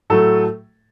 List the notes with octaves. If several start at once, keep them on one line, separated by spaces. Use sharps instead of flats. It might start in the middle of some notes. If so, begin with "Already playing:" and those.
A2 F#3 A3 A4